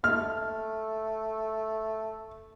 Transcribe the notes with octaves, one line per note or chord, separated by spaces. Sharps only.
A3 F6